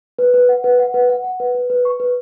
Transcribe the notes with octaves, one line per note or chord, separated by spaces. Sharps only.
B4
B4
F#5
B4
F#5
B4
F#5
F#5
B4
B4
B4
C#6
B4